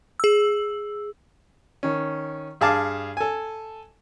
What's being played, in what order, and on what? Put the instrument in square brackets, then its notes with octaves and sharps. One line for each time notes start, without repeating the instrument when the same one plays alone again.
[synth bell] G#4 E6
[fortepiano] D#3 C#4
G2 G#4 F5 A5 D6
A4 G#5